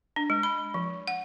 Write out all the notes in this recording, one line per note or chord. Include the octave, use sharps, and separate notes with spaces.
D4
G#3
B5
F3
F#5